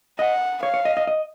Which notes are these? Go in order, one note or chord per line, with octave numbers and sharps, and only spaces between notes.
D#5 F#5
C#5 F5
C#5
D#5
D#5
D#5